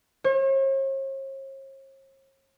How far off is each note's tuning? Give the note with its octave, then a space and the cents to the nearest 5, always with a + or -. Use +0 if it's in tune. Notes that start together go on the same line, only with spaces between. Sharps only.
C#5 -45